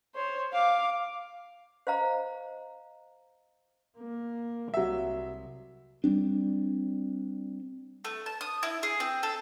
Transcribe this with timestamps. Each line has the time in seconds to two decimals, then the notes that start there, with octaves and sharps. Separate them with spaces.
0.15 C5 C#5
0.53 F5 D6
1.87 C5 D#5 F5 A#5
3.98 A#3
4.74 C2 F#3 E5
6.04 G3 G#3 C4 D4
8.05 A3
8.26 A5
8.41 D#6
8.63 E4
8.83 G#4
9.00 C4
9.23 A4